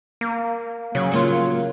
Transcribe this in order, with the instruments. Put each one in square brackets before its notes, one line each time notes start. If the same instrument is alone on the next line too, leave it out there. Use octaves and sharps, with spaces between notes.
[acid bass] A#3
[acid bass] C#3 [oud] F#3
[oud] F#3 A#3 F4